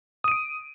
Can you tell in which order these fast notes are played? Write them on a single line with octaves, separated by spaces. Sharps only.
D#6 D#7 D7